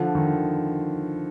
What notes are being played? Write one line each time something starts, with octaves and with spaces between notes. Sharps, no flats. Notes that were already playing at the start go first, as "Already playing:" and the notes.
Already playing: D3 F3
D#3